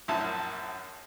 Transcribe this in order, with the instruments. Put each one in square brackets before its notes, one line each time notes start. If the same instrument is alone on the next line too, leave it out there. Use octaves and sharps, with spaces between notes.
[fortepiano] A#1 F#2 E4 A5